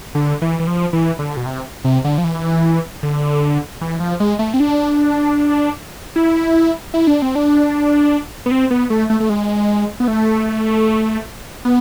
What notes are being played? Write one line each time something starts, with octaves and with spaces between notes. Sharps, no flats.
D3
E3
E3
F3
E3
D3
B2
C3
C3
D3
F3
E3
D3
E3
F3
G#3
A3
C4
D4
E4
E4
D4
C4
D4
B3
C4
B3
A3
A3
A3
G#3
B3
A3
B3